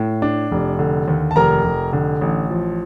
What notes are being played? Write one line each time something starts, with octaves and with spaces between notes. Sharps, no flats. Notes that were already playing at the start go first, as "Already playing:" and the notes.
Already playing: A2
D4
F1
D3
D#2
A5
F1 A#4 A#5
F1
D3
A1
F3